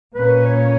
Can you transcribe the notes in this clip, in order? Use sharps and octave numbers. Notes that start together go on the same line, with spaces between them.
A#2 A#3 C#4 B4
C#5